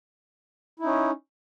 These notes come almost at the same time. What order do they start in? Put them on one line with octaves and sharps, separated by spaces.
E4 D#4 C#4